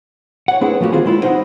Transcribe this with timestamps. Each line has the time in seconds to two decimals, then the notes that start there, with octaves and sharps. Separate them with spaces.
0.48 C#5 F#5
0.61 A3 C4 D4 E4 G#4 B4
0.81 F3 A3 A#3 D4 F#4 G4
0.92 D#3 C4 F4 G#4 C5 G#5
1.06 G#3 E4 F4 E5
1.23 D#4 C5 D#5 F5 F#5